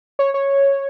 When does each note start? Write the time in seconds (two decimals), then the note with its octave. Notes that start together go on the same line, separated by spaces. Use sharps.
0.19 C#5
0.34 C#5